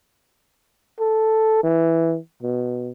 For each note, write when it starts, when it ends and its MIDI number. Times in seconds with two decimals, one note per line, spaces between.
1.00 1.60 69
1.64 2.18 52
2.43 2.92 47